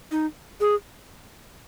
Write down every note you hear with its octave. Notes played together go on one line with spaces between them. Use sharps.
D#4
G#4